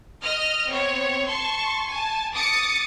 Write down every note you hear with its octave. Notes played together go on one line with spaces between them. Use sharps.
D#5 F6
B3 C4 C#5
A5 C6 C#6
G#5 A5
D6 D#6 A6 C#7